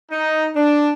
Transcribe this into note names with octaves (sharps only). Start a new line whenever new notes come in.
D#4
D4